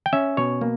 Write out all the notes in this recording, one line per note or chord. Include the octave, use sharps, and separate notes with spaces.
G5
C#4 E5
B2 C#5
A#3